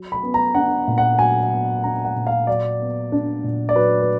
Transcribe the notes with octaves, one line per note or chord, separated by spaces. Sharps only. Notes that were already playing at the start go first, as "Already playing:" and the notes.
Already playing: F#3
B5
B3
A#5
D4 F#5
A#2
F#5
F#3 G#5
B3
D4 A#5
F#5
A#2
F5
F#3 D5
B3
D4
A#2
D5
F#3 B4
B4